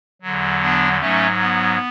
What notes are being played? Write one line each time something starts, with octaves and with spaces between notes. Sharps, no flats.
E2 D3 F#3
B3 D4
G#2 F#3 A3 C#4
B3